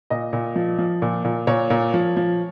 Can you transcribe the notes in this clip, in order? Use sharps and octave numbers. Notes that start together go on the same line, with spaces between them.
A#2 D#5
A#2
F3
F3
A#2
A#2
A#2 C#5
A#2
F3
F3